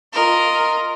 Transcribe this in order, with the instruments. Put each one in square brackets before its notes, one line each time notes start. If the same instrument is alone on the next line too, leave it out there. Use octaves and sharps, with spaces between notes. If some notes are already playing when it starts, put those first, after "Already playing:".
[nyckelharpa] F4 D#5 [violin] A#4